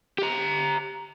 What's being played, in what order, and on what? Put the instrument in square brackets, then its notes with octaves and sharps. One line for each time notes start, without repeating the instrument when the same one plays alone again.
[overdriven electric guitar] G4 A#5